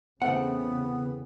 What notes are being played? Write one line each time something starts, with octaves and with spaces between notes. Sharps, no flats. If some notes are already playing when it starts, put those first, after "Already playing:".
E2 C#3 A3 B3 C4 F#5